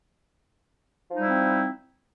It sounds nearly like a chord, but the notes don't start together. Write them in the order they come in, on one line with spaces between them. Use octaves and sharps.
F3 D#4 G3 E4 C4